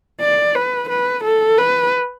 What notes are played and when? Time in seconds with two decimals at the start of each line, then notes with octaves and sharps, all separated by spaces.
0.21 D5
0.55 B4
0.89 B4
1.24 A4
1.58 B4